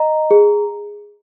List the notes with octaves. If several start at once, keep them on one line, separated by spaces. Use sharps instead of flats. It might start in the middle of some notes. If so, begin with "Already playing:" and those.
Already playing: D#5 A#5
G#4